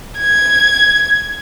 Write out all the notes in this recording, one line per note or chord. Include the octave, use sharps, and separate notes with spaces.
G#6